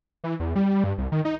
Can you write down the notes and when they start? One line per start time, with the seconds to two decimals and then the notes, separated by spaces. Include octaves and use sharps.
0.24 E3
0.40 E2
0.56 G3
0.84 G2
0.98 C2
1.12 D#3
1.25 D#4